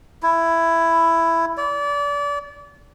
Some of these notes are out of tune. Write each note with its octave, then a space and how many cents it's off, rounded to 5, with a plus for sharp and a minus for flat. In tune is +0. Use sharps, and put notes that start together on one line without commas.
E4 +10
D5 -30